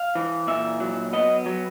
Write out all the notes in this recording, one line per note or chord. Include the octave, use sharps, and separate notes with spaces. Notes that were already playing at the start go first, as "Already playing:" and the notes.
Already playing: F5
E3
A#2 E5
F#3
B3 D#5
F#3